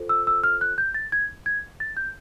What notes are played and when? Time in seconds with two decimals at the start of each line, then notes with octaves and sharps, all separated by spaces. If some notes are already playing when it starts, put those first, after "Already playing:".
Already playing: F4 A4 C5
0.09 E6
0.27 E6
0.44 F6
0.61 F#6
0.78 G6
0.94 A6
1.12 G#6
1.46 G#6
1.80 A6
1.97 G6